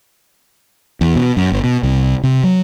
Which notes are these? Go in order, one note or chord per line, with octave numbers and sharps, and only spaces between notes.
E2
B2
F#2
G1
B2
C2
C3
F#3